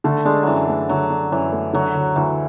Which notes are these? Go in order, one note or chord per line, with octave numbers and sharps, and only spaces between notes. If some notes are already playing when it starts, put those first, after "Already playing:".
D3 A3
G#3 D4
F#2 E3 F#3
A3
D3 F#3
D4
F#2 E3
A3
D3 F#3
D2
D2 E3